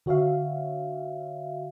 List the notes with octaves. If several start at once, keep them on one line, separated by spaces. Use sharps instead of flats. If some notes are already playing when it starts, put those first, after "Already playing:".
D3 F#4 C#5 E5 F5